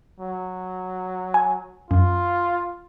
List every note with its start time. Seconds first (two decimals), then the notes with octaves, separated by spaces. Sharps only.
0.20 F#3
1.34 G#5
1.91 F#2 F4